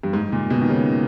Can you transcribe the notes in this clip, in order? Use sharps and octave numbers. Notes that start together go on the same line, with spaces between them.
G2
G#2
A#2
B2
D#3
C#3